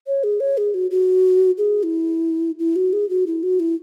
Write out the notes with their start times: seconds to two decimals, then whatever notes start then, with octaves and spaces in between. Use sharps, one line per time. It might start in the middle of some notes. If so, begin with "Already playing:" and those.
0.07 C#5
0.24 G#4
0.40 C#5
0.58 G#4
0.74 F#4
0.91 F#4
1.58 G#4
1.83 E4
2.59 E4
2.76 F#4
2.93 G#4
3.09 F#4
3.27 E4
3.43 F#4
3.60 E4